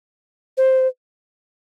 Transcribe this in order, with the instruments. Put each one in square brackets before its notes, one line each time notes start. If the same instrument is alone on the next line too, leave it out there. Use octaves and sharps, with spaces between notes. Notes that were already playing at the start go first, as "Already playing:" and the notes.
[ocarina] C5